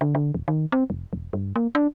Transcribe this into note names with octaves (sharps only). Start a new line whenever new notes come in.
D3
D3
D#1
D#3
C4
F1
E1
G2
A#3
D4